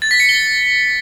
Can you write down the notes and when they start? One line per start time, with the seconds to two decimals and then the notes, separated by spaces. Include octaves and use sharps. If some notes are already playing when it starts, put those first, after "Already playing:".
0.02 A6
0.11 B6
0.20 C#7
0.29 G7